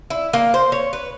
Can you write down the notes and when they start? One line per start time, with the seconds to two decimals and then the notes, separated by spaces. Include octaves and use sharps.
0.10 E4
0.33 A#3
0.54 C5
0.72 C#5
0.93 B4